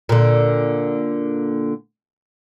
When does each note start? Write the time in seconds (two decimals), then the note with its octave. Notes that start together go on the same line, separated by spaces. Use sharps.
0.09 A#2 D3